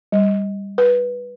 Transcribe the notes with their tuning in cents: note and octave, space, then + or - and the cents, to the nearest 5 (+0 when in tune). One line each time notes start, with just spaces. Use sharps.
G3 +15
B4 -10